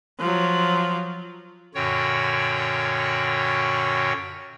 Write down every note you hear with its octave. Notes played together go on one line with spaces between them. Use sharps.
F3 F#3
F#2 A#2 D3 F#4 C#5 G5